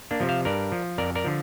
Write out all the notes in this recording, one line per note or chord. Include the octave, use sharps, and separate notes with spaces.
A#3 D4
C3 F3
C5 F5
G2 A#4 D5
F3
F2 A#4 D5
A#4 D5
D3 F3